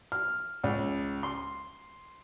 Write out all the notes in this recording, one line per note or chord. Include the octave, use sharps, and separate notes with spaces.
F6
C#2
C6